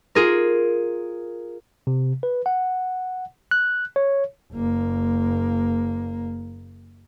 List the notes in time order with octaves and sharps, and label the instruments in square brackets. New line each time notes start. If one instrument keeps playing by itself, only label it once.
[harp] F4 G#4 A#4
[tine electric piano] C3
B4
F#5
F#6
C#5
[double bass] F#1 A#3